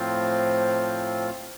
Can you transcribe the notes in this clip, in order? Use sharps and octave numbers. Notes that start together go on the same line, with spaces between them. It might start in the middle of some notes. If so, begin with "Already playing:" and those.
Already playing: A2 F3 C4 F4